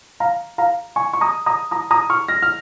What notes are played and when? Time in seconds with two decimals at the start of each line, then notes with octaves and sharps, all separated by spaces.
0.20 F5 A#5
0.58 F5 A#5
0.96 G#5 C#6
1.13 C#6
1.21 A#5 D#6
1.46 A#5 D#6
1.71 A#5 D#6
1.91 A#5 D#6
2.10 C#6 F6
2.28 F6 A#6
2.42 F6